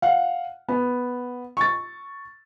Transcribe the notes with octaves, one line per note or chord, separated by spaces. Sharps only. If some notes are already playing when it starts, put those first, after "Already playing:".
F5 F#5
B3
C#6 A6